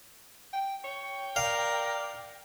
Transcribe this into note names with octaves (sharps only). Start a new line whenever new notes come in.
G5
C#5 G5
A#4 D5 F5